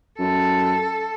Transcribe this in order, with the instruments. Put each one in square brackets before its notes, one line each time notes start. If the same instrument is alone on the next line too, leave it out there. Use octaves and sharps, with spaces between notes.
[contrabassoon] F#2 [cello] A4